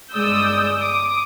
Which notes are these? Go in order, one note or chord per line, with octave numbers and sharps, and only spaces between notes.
G1 G#3 D5 D#6 E6 G6
D6 D#6